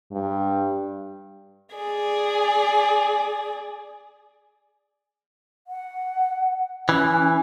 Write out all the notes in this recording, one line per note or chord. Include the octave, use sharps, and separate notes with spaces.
G2
G#4 D5
F#5
E3 C#4